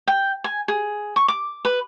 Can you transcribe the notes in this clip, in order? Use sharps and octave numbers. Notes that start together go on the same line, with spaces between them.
G5
G#5
G#4
C#6
D6
B4